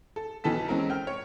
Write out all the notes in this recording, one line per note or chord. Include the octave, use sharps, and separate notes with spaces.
A4
B1 E3 A4 A5 B6
G#3 C4 C#4 A#4
G5 F6
C#5